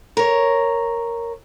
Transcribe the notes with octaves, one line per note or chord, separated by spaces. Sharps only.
A#4 C#5